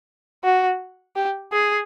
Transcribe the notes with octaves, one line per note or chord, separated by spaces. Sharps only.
F#4
G4
G#4